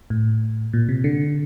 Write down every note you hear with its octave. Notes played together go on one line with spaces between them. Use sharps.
A2
A#2
C3
D3